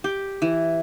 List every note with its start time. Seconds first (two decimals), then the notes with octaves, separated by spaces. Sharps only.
0.04 G4
0.42 E3